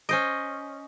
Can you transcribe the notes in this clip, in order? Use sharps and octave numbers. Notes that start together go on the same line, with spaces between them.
C#4 C5 D#5